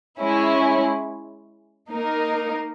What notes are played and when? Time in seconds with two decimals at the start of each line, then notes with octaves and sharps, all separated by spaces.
0.19 G#3 C#4 E4
1.92 A#3 D#4 A#4